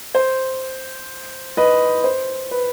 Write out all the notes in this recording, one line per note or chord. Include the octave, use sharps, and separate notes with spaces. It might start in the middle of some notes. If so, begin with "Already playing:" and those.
C5
B4 D#5
C5
B4